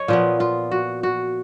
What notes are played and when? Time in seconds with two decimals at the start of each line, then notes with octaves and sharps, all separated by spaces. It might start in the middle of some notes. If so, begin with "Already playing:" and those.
Already playing: C#5 D#5
0.08 A#2 F3 B3 F4
0.40 F4
0.71 F#4
1.03 F#4